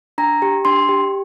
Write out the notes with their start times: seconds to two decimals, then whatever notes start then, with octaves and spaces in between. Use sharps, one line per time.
0.18 D4 A#5
0.42 G4
0.65 D4 C6
0.89 G4